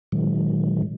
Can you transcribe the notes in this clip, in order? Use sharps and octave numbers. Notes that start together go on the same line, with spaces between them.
A#2 D#3 F#3 G#3